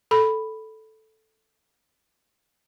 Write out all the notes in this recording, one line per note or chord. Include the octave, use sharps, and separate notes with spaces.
A4 B5